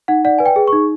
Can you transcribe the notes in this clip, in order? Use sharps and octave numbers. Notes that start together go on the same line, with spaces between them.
D#4 F#5
D5 F#5
B4 G#5
G5
G#4
C#6
D#4